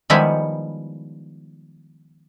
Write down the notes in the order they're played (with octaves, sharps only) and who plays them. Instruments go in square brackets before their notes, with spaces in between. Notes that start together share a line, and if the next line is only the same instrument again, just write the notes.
[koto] D#3 F3 G3 G#3 B3 E4